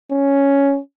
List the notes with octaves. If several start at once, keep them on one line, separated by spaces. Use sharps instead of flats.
C#4